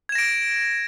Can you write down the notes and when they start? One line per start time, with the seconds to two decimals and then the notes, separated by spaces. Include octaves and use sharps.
0.09 G#6
0.12 E7
0.15 A#6
0.18 D7